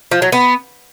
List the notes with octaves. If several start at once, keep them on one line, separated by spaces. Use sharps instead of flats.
F3
F#3
B3